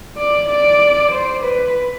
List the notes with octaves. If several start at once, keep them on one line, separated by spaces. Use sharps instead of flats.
D5
D5
C5
B4